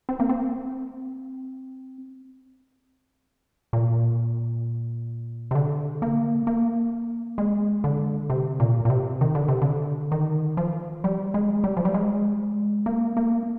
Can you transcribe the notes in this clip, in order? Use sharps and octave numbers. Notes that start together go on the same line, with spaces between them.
C4
A#3
C4
A#2
C3
D3
A#3
A#3
G#3
D3
C3
A#2
A#2
C3
D#3
D3
C3
D3
D#3
F3
G3
G#3
G3
F3
G3
G#3
A#3
A#3